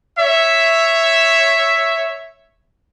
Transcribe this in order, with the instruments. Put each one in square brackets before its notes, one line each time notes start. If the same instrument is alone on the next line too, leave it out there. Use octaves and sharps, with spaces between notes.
[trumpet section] C#5 E5